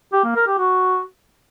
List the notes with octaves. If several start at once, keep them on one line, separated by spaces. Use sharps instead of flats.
G4
A#3
A#4
G4
F#4